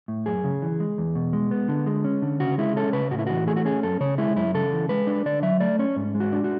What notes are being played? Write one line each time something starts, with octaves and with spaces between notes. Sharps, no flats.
A2
F#2 G#4
C#3
E3
G#3
E2
B2
G#3
B3
D3
G#3
C#4
D3
C#3 F#4
G#3 E4
C#4 A4
C#3 B4
A2 F#4
E4
E3 F#4
A3 G#4
F#4
C#4 G#4
F#2 A4
C#3 C#5
G#3 E4
F#2 E4
C#3 A4
E3
G#3 B4
D4
D3 D5
F#3 E5
A3 D5
C#4 C#5
G#2
G#3
F#4
D4
F#4